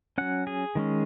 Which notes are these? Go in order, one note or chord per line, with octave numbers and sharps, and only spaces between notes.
F#3 C#4 F#5
G#4
D#3 G#3 C#4